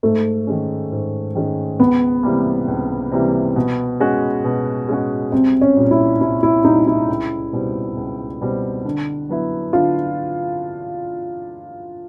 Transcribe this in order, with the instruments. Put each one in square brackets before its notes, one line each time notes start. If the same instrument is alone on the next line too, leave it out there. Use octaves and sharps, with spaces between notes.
[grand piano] G#2 [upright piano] A3
[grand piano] D#3 G#3 C#4
G#2
D#3 G#3 C#4
[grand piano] C#2 [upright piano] B3
[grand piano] C3 E3 G3 A#3
C#2
C3 E3 G3 A#3
B2
G#3 C#4 F#4
B2
G#3 C#4 F#4
[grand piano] C2 [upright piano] C4
[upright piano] C#4
[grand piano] A#2 G3
[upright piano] E4
[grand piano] C2 [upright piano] E4
[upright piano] E4
[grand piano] A#2 G3 [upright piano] D#4
[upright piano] E4
[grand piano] C#2
B2 G3 C4
C#2
B2 G3 C4
D3
F#3 B3 E4
[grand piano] D3 [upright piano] F4